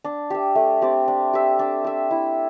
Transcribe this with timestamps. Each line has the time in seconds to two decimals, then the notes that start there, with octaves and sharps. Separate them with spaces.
0.04 D4
0.30 G4 E5
0.55 A3
0.82 C4 G4 D5
1.08 D4
1.33 G4 E5
1.59 D4
1.84 G4 E5
2.11 E4